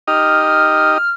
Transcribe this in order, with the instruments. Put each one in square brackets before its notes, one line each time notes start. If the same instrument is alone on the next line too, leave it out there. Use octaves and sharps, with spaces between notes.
[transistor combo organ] D#4 G4 D#5 [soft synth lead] F6